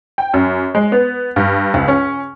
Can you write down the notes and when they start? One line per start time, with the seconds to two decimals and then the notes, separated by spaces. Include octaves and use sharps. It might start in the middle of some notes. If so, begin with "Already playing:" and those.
0.18 G5
0.34 F#2
0.75 G#3
0.92 B3
1.36 G2
1.74 C#2
1.88 C#4